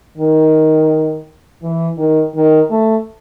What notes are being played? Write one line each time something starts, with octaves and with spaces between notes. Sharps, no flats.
D#3
E3
D#3
D#3
A3